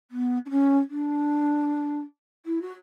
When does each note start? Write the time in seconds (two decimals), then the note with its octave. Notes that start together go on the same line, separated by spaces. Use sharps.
0.11 B3
0.45 D4
0.50 C#4
0.90 D4
2.46 E4
2.62 F#4